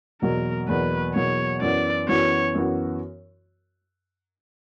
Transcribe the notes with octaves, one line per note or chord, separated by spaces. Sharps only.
E2 B2 F#3 A#3 A#4
E2 B2 F#3 A#3 B4
E2 B2 F#3 A#3 C#5
F#2 E3 B3 F#4 D5
F#2 E3 B3 F#4 C#5
F#2 E3 B3 F#4